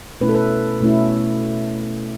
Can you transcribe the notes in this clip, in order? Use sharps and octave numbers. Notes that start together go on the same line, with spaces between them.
B2 A3 C#4 E4 B4
A4
B4
B2 A3 C#4 E4